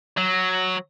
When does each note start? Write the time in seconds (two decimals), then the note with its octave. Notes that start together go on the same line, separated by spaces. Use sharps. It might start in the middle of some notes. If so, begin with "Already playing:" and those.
0.18 F#3